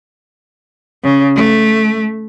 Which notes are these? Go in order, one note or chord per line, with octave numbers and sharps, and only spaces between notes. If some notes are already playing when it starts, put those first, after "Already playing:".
C#3
A3